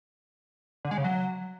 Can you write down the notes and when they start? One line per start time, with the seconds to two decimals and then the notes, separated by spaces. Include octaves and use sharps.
0.85 D3
0.91 G#3
0.98 C#3
1.04 F#3